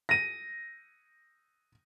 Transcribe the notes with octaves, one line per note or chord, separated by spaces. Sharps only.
A#6 D#7